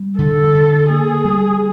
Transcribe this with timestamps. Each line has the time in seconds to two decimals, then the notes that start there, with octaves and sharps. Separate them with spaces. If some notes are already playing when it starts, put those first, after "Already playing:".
Already playing: G3
0.19 D3 A4
0.55 D3
0.89 A#3 G#4
1.25 G3